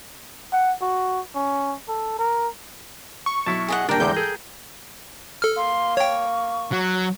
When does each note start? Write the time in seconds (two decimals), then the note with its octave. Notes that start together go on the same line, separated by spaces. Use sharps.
0.53 F#5
0.82 F#4
1.35 C#4
1.88 A4
2.19 A#4
3.26 C#6
3.46 B1 E4 A5
3.68 G#4 D#5 F#5
3.89 D#1 A#3 D4 A#4 G5 A#6
4.00 E2 G#2 D3 E3 G#3 G6
4.17 G#4 A4
5.42 A4 F6
5.57 A#3 C6
5.97 C#5 G5 C#6
6.72 F#3